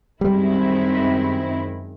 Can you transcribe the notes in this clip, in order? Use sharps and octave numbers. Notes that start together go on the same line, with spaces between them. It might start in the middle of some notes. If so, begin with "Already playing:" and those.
F#2 D#3 G3 G#3 C4 E4